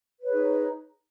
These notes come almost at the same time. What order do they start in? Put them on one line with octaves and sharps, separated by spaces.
B4 C#5 G#4 D#4